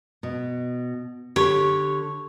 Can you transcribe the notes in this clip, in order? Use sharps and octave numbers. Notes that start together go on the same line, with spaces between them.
B2
D3 G4 C#5